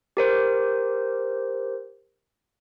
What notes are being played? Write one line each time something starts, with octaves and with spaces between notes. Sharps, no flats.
G4 A#4 C5